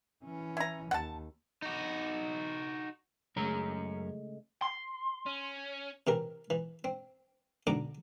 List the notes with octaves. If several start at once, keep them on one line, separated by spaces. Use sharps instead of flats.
E3 C#4
E4 A#5
D#2 F#5 A5
D#4 F#4
F#2 C#3 G#3 A3 C#5 A#5
C6
C#4
C3 E3 A#4
E3
C4
B1 D3 A#5 C#6 D6